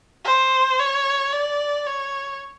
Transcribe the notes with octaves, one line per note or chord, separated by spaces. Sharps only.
C5
C#5
D5
C#5